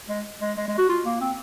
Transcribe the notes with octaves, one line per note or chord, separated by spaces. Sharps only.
G#3
G#3
G#3
G#3
F#4
F4
A#3
C4